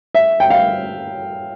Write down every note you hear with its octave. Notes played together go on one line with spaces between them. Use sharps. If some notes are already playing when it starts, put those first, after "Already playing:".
E5
G5
F5